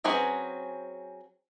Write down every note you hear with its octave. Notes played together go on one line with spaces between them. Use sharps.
F#3 C4 C#4 G#4 B4